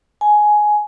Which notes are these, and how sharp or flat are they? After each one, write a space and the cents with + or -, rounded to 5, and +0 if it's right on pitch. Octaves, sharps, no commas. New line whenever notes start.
G#5 +10